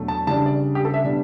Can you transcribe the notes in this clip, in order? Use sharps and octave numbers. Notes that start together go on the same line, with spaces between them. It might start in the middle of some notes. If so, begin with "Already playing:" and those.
Already playing: E2 B2 F#3 A3 D4
A5
C#3 G3 D4 A5
D5
G4
A4
E5
B2 G3 D4